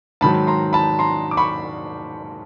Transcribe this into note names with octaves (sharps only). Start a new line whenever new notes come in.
G#2 D#3 F#3 A5 B5
A#5 C6
A5 B5
A#5 C6
D6
B5 C#6